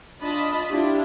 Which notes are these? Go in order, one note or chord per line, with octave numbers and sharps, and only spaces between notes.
D4 F4 D#5 A5 B5
D4 E4 F4 G4